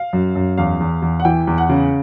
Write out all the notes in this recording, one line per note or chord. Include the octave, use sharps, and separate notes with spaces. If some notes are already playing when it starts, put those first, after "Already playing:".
Already playing: F5
F#2
F#2
E2 F5
E2
E2
F#5
E3 G5
E2
F#5
C#3